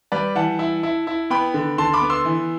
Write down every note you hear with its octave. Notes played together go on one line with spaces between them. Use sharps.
G3 B4 D5
E3 F#5 A5
E4
E4
E4
B3 G5 B5
D3
D3 A5 C6
B5 D6
B3
C6 E6
E3